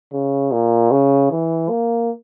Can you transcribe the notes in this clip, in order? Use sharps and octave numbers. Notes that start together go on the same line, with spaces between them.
C#3
A#2
C#3
E3
A#3